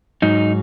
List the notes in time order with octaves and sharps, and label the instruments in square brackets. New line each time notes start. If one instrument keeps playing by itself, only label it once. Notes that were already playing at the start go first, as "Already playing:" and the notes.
[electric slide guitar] G#2 F#3 D#4